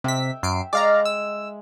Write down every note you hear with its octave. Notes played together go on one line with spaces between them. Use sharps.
C3 E5 G5 B6
F#2 C7 D7
G#3 D5 F5 A#5
E6